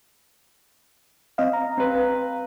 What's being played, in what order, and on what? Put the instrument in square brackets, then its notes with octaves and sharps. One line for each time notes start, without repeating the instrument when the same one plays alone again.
[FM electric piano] C4 D#5 F5
F5 A#5
[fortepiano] C4 B4